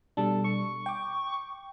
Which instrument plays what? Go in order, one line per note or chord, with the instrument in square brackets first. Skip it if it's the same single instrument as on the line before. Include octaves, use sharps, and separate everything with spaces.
[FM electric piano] B2 G3 D4 [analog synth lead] A4
[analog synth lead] C#6
[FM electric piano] G5 D6